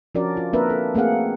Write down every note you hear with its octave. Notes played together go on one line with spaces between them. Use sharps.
F3 C#4 D4 F#4 A#4 D5
F4
A#3 C4 D4 A#4 B4 E5
A4
A3 A#3 C4 G#4 F5 F#5